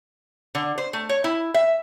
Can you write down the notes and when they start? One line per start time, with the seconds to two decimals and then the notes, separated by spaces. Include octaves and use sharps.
0.55 D3
0.78 C5
0.93 A3
1.09 C#5
1.24 E4
1.54 E5